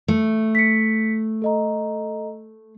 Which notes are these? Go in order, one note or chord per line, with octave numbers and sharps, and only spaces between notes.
A3
B6 C#7
A4 D#5 A#5